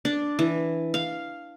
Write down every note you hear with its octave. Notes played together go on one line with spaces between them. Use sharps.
D4
E3
F5